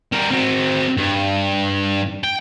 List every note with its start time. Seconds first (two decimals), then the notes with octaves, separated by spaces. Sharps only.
0.12 G3 A#4
0.31 C4 F#4
0.97 G2
2.24 G5